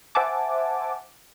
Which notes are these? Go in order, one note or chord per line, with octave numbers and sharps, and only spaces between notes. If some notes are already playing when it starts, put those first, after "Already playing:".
C5 E5 F#5 G#5 A5 D6